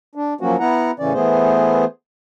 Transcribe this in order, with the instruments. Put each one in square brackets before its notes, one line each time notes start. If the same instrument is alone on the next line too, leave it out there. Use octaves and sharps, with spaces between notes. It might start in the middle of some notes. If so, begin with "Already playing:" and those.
[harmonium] D4
F3 F#3 A#3 C#4 F#4
B3 E4 F#5 A#5
A2 C#3 E3 C#4 D5
E3 A3 B3 G#4 C5